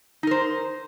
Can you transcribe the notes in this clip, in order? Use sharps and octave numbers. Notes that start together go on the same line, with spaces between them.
D#4 A#4 C5